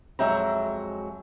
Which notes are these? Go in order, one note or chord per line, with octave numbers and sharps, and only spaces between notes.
F2 F#3 G#3 E5 G5 A#5